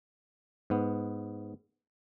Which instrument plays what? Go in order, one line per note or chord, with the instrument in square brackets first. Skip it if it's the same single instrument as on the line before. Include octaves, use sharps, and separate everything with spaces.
[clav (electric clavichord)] G#2 B3